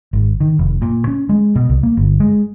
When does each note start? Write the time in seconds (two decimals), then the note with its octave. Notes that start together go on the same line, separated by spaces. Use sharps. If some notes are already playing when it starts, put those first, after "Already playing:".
0.13 G#1
0.40 D#3
0.59 F1
0.82 A#2
1.07 C#4
1.29 G#3
1.55 B2
1.69 C2
1.83 A#3
1.97 G1
2.20 G#3